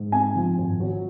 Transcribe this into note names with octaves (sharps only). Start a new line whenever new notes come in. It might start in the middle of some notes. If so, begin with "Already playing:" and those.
Already playing: G#2
C4 G#5
F3
G#1
F#3